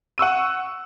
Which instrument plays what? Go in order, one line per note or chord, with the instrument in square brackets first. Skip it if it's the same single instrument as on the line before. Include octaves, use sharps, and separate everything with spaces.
[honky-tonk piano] F#5 C#6 E6 D#7